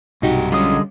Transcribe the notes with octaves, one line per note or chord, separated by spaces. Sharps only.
B1 G2 C3 D#4 F#4 G4
D3 G3 G#3 C#4 F4 D#6